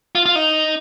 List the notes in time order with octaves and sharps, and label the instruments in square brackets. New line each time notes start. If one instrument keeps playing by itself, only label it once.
[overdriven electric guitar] F4
F4
D#4